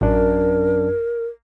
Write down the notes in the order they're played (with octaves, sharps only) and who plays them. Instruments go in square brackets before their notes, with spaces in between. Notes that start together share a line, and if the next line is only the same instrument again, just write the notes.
[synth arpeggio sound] A1 [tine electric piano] F#2 D4 [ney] A#4